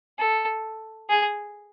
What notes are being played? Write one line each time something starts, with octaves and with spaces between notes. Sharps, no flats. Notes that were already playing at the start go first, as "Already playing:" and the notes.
A4
G#4